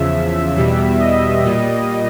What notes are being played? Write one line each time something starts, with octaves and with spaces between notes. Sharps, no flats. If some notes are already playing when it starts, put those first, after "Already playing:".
Already playing: E2 C#3 F3 E5
E2 B2 G3
D#5
A#2 G3